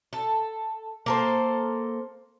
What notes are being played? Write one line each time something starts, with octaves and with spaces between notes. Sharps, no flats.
A4
A#3 A4 C5